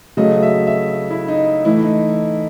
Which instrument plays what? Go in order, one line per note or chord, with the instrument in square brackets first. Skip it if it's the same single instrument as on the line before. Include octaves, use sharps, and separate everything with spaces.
[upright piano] C#3 F#3 A3 D#5
E5
E5
E4
D#4
A2 E3 A3 E4
D#4